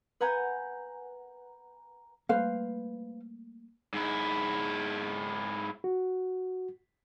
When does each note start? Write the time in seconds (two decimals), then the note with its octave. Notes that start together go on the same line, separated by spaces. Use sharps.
0.21 B4 F#5 G#5 A#5 G6 G#6
2.29 G3 A3 A#3 B4 C5 F5
3.94 G#2 E4
5.84 F#4